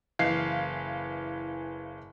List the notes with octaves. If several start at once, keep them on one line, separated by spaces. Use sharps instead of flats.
F#1 E3 F5 C7